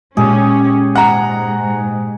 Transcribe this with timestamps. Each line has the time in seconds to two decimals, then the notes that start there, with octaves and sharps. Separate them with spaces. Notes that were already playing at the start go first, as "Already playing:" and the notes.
0.17 A#2 G#3 C#4 G4 G#4
0.96 G#2 F#5 A#5